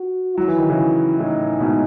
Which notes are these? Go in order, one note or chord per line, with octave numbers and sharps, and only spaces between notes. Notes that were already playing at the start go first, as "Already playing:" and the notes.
Already playing: F#4
F#3 E4
E3
D#3
C#3 E3
A2 D#4
G#2 B2